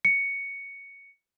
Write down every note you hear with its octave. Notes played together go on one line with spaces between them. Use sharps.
C#7